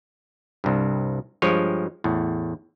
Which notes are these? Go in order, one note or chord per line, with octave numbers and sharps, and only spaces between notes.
C2 G2
G2 F3 G#3 C#5
E2 A2